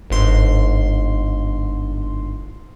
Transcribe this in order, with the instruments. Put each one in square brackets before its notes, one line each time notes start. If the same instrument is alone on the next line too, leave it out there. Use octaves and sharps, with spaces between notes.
[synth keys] G1 G#2 C6